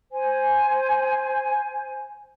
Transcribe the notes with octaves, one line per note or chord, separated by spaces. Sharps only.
C5 G#5